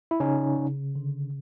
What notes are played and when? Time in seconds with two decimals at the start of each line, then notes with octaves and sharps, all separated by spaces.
0.11 E4
0.20 C#3 C#4 D#4
0.59 C#3
0.95 D3